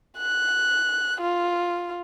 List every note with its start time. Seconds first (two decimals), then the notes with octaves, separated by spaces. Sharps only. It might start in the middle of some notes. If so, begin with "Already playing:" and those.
0.18 F#6
1.21 F4